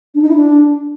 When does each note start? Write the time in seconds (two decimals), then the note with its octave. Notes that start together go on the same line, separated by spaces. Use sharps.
0.15 D4
0.22 D#4
0.29 E4
0.36 D4